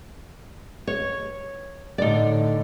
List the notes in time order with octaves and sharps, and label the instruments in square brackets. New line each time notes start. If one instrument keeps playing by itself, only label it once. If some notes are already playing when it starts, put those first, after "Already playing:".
[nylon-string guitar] C#5
[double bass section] A2 D3 [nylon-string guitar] D#4 D5